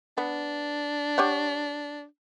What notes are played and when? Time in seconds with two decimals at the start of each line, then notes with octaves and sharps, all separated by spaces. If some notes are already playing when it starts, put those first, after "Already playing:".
0.18 B3 D4
1.18 G4 C#5 F#5